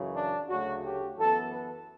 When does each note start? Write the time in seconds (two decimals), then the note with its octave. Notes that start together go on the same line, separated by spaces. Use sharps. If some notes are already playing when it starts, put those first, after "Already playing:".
Already playing: F#2 C#3 E3
0.15 D4
0.49 D2 C#3 F#3 A3 F#4
0.84 G4
1.17 F#2 E3 B3 A4
1.51 B4